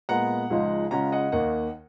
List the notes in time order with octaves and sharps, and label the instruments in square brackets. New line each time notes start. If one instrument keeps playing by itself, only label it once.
[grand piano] A#2 G#3 B3 F#5 A#5
C#2 C#3 F3 G#3 D#4
C#3 G#3 C#4 F4 F#5 A#5
D#5 F#5
D#2 D#3 A#3 D#5 F#5